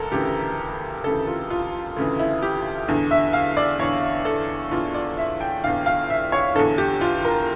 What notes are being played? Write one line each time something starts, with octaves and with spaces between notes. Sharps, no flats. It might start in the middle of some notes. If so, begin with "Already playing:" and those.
Already playing: D2 A4 A#4
D2 C#3 E3 G4
D2 C#3 E3 A4
F4
F4
D2 C#3 E3
E4
G4
E2 D3
E5
F5
D5
E2 D3 C#5
A4
E2 D3 F4
D5
E5
G5
E2 D3 F5
F5
E5
C#5
E2 D3 A4
G4
F4
A#4